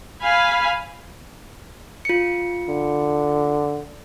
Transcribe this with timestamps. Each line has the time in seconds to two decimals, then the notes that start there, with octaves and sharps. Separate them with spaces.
0.22 F5 G#5 B5
2.05 F4 C#7
2.69 D3